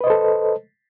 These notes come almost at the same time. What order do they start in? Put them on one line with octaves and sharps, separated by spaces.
B4 D#5 C5 A4